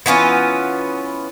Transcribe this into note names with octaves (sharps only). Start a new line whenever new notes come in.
E3 B3 C#4 F4